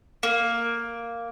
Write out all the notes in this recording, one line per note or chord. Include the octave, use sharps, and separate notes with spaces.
A#3